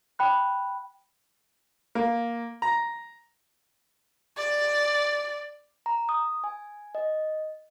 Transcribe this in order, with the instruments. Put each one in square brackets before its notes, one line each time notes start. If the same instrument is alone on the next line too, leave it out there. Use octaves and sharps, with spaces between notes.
[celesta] G5 B5 F#6
[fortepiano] A#3
A#5
[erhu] D5
[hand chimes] A#5
D#6
G#5
D#5